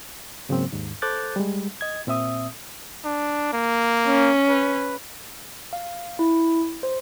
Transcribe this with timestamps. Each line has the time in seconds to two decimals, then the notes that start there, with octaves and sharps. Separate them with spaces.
0.49 G#2 C#3 F#3 A#3 C4
0.72 D#2 G#2
1.02 A4 C5 D6 F#6 G6 A6
1.36 G3 G#3
1.81 D#5 G#6
2.07 A#2 C4 E5 D#6
3.05 D4
3.53 A#3
4.07 C#4
4.49 B4
5.73 F5
6.19 E4
6.83 C5